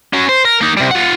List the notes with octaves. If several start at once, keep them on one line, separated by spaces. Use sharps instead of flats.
C#4 F#4
C5
A#4
A#3 D#4
C3 G3
F4 F#5